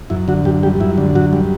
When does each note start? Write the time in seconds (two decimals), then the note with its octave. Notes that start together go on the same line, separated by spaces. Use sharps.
0.10 F#2 E4
0.28 D3 F#4
0.45 F#2 G4
0.63 G3 G4
0.80 F#2 E4
0.98 D3
1.15 F#2 F#4
1.33 G3